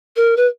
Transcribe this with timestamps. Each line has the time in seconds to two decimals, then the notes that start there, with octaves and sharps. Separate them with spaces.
0.16 A#4
0.37 B4